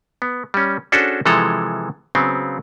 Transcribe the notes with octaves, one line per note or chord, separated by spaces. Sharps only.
B3
G3 C#4
C#4 D4 F#4 G#4 A4 C5
C3 E3 F3 G#3 A4 A#5
C#3 F#3 B3 C4